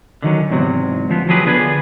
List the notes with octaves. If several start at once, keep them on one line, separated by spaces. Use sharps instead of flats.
D3 D#3 F#3 C#4
E2 G#2 C3 F#3
D2 F3 B3
F3 F#3 G4 G#4 B4
D3 B3 D4 G#4 B4